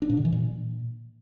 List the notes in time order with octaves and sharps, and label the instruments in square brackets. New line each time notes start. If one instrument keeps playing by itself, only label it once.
[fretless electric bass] D4
A#2
D3
E3
A#2